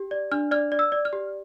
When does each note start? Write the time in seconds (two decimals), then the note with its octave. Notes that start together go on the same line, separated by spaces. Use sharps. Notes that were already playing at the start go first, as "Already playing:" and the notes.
Already playing: G4
0.11 D5
0.32 D4 F6
0.51 D5 F6
0.72 D5
0.79 E6
0.92 D5
1.05 F6
1.13 G4